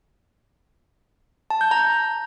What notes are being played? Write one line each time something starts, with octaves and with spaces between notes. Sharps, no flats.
A5
G6
A#5